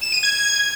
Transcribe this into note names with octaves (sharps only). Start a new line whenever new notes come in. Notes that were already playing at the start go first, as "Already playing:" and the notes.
E7
D#7
G#6